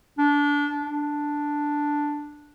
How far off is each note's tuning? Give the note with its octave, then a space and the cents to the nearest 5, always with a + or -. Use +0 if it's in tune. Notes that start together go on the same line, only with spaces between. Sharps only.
D4 -20
D4 +0